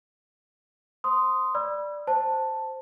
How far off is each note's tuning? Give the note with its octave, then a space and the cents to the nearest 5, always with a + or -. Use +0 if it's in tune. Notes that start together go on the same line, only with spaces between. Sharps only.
C5 +0 C6 -10 D#6 +0
D5 +5 B5 -20 E6 +40
C5 +0 A5 +5